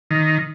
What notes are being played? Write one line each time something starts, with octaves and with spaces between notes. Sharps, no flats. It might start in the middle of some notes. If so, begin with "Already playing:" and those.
D#3